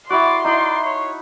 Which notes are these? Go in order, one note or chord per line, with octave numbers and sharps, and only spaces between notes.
E4 F#4 D5 C6
D#4 E4 D5
C#5